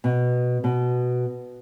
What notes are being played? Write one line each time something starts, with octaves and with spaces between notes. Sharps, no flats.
B2
B2